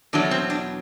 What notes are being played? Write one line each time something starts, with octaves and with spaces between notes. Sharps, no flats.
E2 B2 F#3 A3 D4
C4
D4